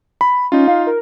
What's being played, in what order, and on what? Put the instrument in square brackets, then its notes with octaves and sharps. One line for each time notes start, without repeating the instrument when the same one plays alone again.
[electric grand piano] B5
[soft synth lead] C#4 [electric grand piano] D#4 F4
[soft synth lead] F5
A#4